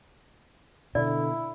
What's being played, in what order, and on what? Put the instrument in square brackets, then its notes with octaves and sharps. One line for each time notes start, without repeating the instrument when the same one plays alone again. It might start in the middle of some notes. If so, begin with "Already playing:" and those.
[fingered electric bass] B2 [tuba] D3 [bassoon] E4 [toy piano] D5